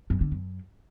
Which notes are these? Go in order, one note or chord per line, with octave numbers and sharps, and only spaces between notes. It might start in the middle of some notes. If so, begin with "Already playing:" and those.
F#2
D3
F#2